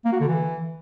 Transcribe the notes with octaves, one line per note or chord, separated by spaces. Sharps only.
A#3
F#4
D3
E3